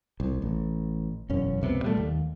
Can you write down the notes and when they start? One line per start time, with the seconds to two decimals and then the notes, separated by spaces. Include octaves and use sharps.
0.20 C2
0.42 A1
1.29 E1 F#2 C#4
1.61 C#2 C3 E3 B3
1.83 A#2 G3 A3
1.97 D#2